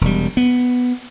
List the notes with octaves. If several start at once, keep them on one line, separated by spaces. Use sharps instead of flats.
E1 G3
B3